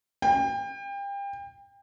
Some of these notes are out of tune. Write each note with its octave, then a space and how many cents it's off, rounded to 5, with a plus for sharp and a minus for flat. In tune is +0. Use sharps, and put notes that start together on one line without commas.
G5 +30